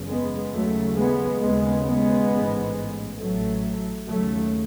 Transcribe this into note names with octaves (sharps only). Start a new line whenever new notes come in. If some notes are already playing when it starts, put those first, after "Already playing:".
Already playing: F#1 E2 C#3
G#3 B3
D#2 C#3 F#3 A3
G#3 B3
D#2 C#3 G#3 B3
G#3 B3
A1 G#2
A1 A2 F#3 A3
D#2 C#3 F#3 A3